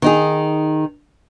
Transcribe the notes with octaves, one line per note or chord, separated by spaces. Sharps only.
D#3 D#4 G#4